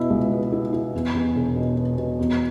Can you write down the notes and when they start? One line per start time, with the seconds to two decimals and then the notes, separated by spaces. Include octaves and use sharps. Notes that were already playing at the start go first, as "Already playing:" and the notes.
Already playing: B2 E4
0.10 C#2
0.32 B3
0.52 E4
0.73 E4
0.94 E2
1.15 E2
1.35 E1
1.55 B2
1.77 B2
1.97 B2
2.19 E2